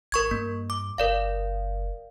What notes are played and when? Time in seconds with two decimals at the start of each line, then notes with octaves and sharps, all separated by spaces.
0.12 G#1 A#4 C#6 G#6
0.31 G2 A#3
0.70 D6
0.98 F#1 A#4 D5 F5